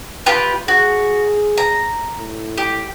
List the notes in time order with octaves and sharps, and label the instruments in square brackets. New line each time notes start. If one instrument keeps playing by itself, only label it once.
[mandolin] F4 G4 B4
[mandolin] F#4 [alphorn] G#4
[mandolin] A#5
[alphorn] A2
[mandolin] G4